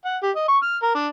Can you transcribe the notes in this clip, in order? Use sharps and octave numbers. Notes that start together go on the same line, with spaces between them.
F#5
G4
D#5
C#6
F6
A#4
D4